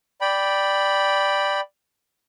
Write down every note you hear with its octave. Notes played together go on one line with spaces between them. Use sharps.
D5 G5 B5